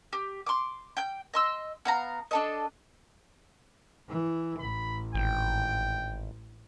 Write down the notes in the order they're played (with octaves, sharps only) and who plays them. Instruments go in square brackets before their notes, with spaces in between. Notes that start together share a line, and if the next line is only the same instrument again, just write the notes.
[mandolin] G4
C6 D6
G5 G6
D#5 C6 E6
B3 F5 A#5
D4 A4 D#5
[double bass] E3
[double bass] A1 [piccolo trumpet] B5
[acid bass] G#1 [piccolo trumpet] G5